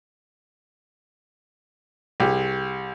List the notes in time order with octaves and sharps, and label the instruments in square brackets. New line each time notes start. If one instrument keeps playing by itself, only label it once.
[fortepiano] C2 [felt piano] G4 G#4 D6